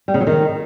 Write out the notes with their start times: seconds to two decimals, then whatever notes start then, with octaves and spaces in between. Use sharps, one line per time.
0.08 G3
0.14 C#3
0.20 F#3
0.27 D#3